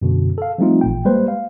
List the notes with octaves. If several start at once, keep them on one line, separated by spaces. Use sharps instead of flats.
F#2 B2 D3
A4 F5
F3 G3 A3 C4 D#4 F4
A1 A#2 G5
G3 G#3 A#3 B4 C5
F5